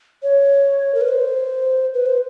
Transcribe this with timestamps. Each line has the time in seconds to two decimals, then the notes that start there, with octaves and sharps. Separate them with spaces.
0.23 C#5
0.95 A#4
1.01 B4
1.08 C5
1.94 B4
2.06 C5